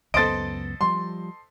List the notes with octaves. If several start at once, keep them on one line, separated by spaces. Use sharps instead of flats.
C#2 F#2 B3 A4 C5 D#5 A6 D7
F3 G3 C6